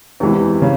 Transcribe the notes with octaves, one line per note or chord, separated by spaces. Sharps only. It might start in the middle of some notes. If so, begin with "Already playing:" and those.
E2 C3 E3 G#3
C#3